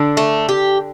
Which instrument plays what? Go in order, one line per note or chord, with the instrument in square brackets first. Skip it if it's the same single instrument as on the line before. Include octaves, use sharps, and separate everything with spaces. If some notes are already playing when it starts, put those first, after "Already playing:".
Already playing: [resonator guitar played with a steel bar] D3 D4
[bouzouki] A3
G4